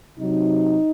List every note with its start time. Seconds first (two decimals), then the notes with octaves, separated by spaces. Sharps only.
0.18 C3 F#3 D#4